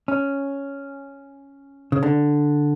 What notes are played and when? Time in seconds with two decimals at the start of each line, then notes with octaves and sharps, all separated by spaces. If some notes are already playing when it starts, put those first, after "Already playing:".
0.08 C#4
1.92 C#3
2.03 D3